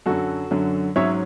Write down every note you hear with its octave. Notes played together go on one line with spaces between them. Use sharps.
F#2 D3 F#3 F#4 A4
F#2 D3 F#3
G#2 F#3 C#4 C#5 E5